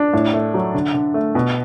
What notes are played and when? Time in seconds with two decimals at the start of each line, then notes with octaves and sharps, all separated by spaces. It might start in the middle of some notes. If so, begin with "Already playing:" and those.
Already playing: D4
0.13 A2
0.33 A3
0.54 F#3
0.74 D3
0.94 D3
1.14 A3
1.35 B2